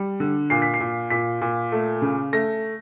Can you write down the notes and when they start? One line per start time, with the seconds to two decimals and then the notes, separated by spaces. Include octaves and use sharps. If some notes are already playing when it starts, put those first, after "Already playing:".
Already playing: G3
0.20 D3
0.50 A#2 C7
0.62 B6
0.74 C7
0.80 A#2
1.10 A#2 B6
1.42 A#2
1.72 A3
2.02 C#3
2.33 A3 A#6